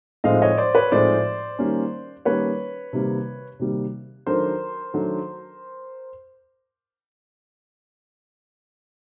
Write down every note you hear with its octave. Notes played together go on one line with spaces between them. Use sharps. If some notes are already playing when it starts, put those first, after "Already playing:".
A2 F3 G#3 C4 D#4 D#5 F5
C#5 D#5
C5 D5
B4 C#5
A2 F3 G#3 C4 D#4 C5 D5
D#3 G3 A#3 C#4
D#3 G3 A#3 C#4 B4 C#5
C3 D#3 G3 A#3
C3 D#3 G3 A#3
D#3 F#3 A3 D4 A#4 C5
D#3 F#3 A3 D4